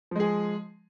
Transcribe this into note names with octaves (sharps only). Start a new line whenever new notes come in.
F3 G#3 G#4